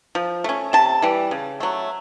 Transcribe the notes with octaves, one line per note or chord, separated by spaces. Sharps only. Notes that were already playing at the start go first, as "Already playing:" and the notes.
F3
A3 C#4
C3 A5
E3 G3
C#3
F#3 A3